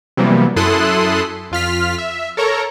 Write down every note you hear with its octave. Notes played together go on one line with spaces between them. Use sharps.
C3 E3 F#3 G3 A#3 B3
F#2 E4 A4 C6 D#6 F#6
F2 F4 F6 B6
E5
A4 A#4 C#5 A#5